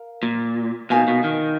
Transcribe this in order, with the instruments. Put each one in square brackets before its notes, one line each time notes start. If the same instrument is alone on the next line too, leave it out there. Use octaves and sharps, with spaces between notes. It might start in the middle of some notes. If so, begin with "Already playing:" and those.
Already playing: [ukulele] A#4 F5
[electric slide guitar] A#2
[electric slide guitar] B2 [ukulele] D#4 A#4 F5 G#5
[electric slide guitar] B2
D#3